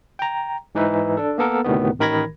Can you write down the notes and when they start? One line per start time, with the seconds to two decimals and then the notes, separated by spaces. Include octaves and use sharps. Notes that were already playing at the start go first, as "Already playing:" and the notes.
0.19 G5 A#5
0.75 G#2 E3 D#4 B4 E5
1.17 D4 A4
1.38 A#3 B3 A4 A#4
1.64 D2 A2 C3 D#3 B3
1.99 A1 D#3 A#4 B5 G#6 A#6